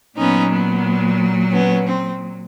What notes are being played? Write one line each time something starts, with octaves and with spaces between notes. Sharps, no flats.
A#2 F#3 B3 C#4 D#4
B3
B3 C#4
C4